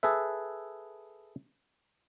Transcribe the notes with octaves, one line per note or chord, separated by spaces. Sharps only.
G#4 A4 B4 E5